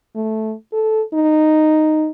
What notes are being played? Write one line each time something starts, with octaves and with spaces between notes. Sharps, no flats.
A3
A4
D#4